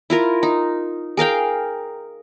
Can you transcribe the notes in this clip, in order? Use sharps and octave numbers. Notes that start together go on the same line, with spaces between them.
E4 F4 A#4
D#4
G#4 A#4 F5 G5